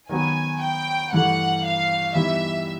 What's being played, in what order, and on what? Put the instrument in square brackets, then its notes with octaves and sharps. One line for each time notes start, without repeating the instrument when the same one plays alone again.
[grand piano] D#3 F#3 B3 [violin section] G#5
[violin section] G5
[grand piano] G2 E3 A3 [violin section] F#5
[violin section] F5
[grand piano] G2 E3 G3 B3 D#4 [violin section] E5